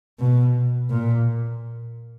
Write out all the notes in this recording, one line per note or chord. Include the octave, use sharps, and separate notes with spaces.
B2
A#2